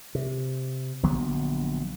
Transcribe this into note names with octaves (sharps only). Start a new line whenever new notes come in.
C3
A#1 D3 F#3 B3